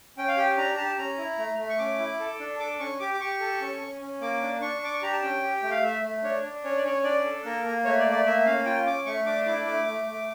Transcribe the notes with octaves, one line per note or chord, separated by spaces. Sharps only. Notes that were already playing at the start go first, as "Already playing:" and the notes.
C#4 G5
F5
G4 G5
D4 A#5
A#5
G4 A5
C#4 A#5
E4
A3
A3
C#6
C#4 D6
E4
A4
D4
A4 D6
C#4 C#6
G4 D6
D6
G4 C#6
A4
C#4
C#4
C#4
A#3 D6
D4
D4 C#6
D4 D6
C#6
G4 A#5
A5
C#4 G5
G4
G5
A3
F5
A3 E5
A3
D4 C#5
D4
C#4 C#5
D5
C#4 C#5
D4 D5
A4
A#3 A#4
A#3
A3 C#5
D5
A3
D5
A#3 E5
C#4 F5
F4 G5
C#4 D6
A3 C#6
D4 D6
E4 D6
A3 D6
A3
A3